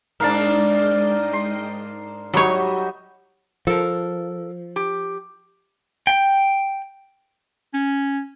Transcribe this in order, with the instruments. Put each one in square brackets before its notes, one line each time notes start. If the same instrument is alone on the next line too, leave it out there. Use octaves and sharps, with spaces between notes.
[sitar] G#2 D4 [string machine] G#3 D#5 G5 [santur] A#4 F5 A5
[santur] C6
[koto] F#3 C#5 [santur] G3 D#4 F#4 [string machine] D#5 E5
[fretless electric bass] F3 [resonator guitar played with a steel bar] A4 A#4
[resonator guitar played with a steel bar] G4
[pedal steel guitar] G5
[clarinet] C#4